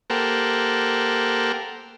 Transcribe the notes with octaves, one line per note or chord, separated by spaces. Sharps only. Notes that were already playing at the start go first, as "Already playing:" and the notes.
A#3 G4 A4 A#4 C5 F#5